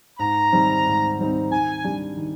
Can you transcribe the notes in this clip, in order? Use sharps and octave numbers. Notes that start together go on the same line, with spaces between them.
G#2 A#5
D#3 G3 C4 D#4
G#2
D#3 G3 C4 D#4
D#3 G#5
G3 D4 G4
D#3